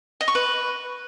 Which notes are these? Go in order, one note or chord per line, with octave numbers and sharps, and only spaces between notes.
D#5
C#6
B4